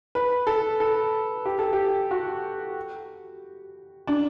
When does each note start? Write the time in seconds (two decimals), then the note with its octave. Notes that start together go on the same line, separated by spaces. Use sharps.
0.15 B4
0.47 A4
0.80 A4
1.45 G4
1.59 A4
1.73 G4
2.11 F#4
4.07 D4